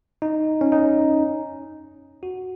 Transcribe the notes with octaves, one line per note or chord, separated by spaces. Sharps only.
D#4
C#4
D#4
F#4